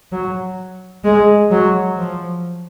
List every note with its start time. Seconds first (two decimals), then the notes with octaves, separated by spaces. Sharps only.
0.12 F#3
1.04 G#3
1.51 F#3
1.97 F3